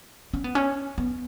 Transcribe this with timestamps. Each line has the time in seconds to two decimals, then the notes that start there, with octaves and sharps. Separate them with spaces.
0.33 C#4
0.44 B3
0.55 C#4
0.98 B3